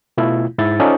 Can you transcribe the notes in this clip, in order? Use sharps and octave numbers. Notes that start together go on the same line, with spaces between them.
B2 A3 E4 F4
G#2 E4 A6
C#4 D#4 F4 A4 C5 D5